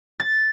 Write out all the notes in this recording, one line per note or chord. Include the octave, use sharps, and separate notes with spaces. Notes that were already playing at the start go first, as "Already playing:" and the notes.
A6